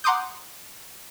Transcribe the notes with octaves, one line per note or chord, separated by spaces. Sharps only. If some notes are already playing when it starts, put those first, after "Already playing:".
F#5 A#5 C6 D6 D#6 G6